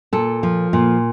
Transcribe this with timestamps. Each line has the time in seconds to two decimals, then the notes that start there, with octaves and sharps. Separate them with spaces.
0.13 A#2 A4
0.43 F3
0.73 A#2